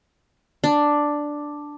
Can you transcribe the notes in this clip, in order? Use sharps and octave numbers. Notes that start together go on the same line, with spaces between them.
D4